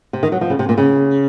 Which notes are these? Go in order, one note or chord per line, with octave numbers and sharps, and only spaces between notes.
C3
D#3
F#3
F3
C#3
C3
A#2
C#3